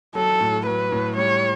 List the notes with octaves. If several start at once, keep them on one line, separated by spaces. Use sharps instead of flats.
F#3 A4
A2
F#3 B4
A2
G3 C#5